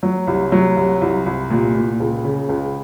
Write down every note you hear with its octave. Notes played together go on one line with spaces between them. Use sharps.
F#3
C2
F#3
C2
C2
C2
A#2
A#2
C#2
C#3
C#2